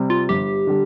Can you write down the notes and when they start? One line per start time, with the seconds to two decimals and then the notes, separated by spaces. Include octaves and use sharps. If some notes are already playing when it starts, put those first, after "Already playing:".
Already playing: C3 G3
0.10 F4
0.29 G1 G4
0.67 D3 G3